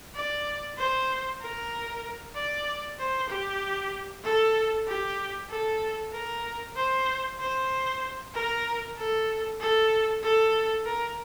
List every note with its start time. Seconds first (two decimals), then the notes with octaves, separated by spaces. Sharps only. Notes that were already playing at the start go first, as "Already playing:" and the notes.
0.15 D5
0.78 C5
1.41 A#4
2.35 D5
2.99 C5
3.30 G4
4.24 A4
4.88 G4
5.50 A4
6.13 A#4
6.76 C5
7.40 C5
8.35 A#4
8.98 A4
9.60 A4
10.23 A4
10.85 A#4